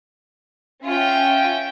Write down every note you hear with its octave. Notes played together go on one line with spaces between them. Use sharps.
C#4 F4 E5 G5